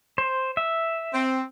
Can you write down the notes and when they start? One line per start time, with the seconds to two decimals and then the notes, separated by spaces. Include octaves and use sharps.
0.18 C5
0.57 E5
1.13 C4